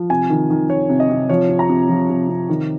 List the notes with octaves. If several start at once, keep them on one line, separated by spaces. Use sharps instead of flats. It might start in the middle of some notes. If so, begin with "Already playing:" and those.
Already playing: F3
C3 G#5
D#3
D#3
D#3 C#5
C3
D#5
C3
F3 C#5
C3
A#5
C3
F3
C3
C3
D#3